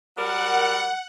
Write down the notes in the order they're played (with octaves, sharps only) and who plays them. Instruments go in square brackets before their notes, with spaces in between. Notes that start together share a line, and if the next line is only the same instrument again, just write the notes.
[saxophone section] F#3 G3 A#4 [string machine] F#5